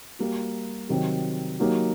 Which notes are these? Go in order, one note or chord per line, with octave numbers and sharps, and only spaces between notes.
G3 A#3 F#4
C3 D#3 F#3 C4
F#3 A#3 D#4 G4